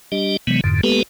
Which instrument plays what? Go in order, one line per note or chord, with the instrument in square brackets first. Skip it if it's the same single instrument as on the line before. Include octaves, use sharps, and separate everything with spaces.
[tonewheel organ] G3 D4 G4 D#5
C3 E3 F#3 G#3 B3
F2 G#2 D3
G#3 A#3 B3 G4 A4 B4